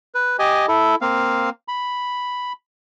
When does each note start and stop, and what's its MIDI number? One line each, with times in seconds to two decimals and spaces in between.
0.15 0.37 71
0.39 0.66 67
0.39 0.66 75
0.39 0.66 80
0.68 0.95 64
0.68 0.95 69
1.01 1.50 58
1.01 1.50 60
1.01 1.50 77
1.68 2.53 83